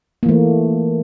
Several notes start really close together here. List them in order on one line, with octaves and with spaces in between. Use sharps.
A#3 E3 A3